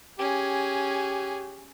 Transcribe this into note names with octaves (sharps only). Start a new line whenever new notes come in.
C#4 G4 G#4